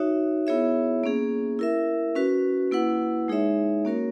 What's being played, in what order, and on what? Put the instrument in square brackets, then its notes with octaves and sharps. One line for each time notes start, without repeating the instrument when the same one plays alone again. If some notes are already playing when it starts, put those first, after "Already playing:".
Already playing: [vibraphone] D#4 F#4 C#5 E5
B3 E4 G#4 C#5 E5
A#3 C#4 G#4
E4 A#4 E5
C#4 F#4 B4
A#3 E4 B4 F#5
G#3 D#4 G#4 C#5 E5
A#3 C#4 F#4 A#4 C#5